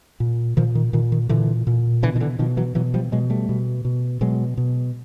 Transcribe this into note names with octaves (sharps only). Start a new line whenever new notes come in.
A#2
A#2 D#3 F3
D#3
A#2 D#3
D#3
A#2 D3 E3
A#2
B2 D3 E3
D#3
D3 E3
B2 D#3 F3
E3 F#3
B2 E3 F#3
F3 G3
B2 F#3 G#3
G3 A3
B2
B2
B2 F#3 G#3
B2